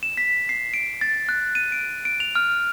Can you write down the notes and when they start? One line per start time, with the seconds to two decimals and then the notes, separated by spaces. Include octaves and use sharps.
0.03 E7
0.17 B6
0.49 C7
0.74 D7
1.01 A6
1.29 F#6
1.55 D#7
1.72 D7
2.05 D7
2.20 F7
2.35 F6